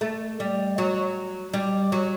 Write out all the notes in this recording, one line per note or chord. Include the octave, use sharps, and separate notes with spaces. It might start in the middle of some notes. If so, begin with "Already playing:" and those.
A3
G3
F#3
G3
F#3